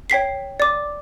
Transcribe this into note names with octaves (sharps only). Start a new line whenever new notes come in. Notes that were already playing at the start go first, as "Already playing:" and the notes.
C#5 G5 B6 C7
D5 D6